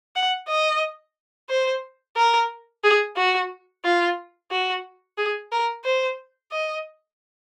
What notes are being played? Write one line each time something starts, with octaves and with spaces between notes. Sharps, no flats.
F#5
D#5
C5
A#4
G#4
F#4
F4
F#4
G#4
A#4
C5
D#5